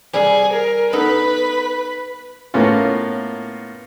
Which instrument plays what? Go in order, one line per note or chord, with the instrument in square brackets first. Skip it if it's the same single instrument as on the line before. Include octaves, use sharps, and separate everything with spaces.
[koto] C3 G3 [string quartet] G#4
[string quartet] A#4
[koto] B3 D#4 A4 [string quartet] B4 B5
[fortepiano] A2 A#3 B3 C#4 F4